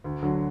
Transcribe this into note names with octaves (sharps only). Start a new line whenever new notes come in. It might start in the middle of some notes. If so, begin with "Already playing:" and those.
D2
D3 F#3